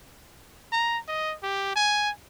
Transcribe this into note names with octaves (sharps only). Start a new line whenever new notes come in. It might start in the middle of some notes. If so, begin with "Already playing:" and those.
A#5
D#5
G4
G#5